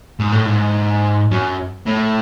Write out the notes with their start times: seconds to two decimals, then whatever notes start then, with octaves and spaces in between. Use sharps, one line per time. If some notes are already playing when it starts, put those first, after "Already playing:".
0.20 G#2
0.32 A2
0.46 G#2
1.31 F#2
1.86 A2